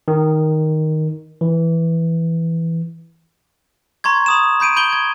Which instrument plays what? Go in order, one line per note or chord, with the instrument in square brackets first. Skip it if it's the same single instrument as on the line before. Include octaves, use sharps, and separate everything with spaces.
[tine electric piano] D#3
E3
[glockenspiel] A#5 C6 C#6 G#6
B5 D#6 E7
B5 G6 D7 D#7
B5 G6 D7 G7
G#6